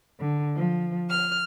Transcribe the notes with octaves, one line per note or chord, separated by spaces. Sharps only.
D3
F3
F6